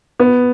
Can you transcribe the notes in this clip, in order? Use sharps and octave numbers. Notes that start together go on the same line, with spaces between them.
B3